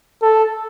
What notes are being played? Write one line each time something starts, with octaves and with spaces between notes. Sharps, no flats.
A4